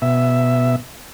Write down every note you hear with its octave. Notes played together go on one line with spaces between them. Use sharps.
B2 E5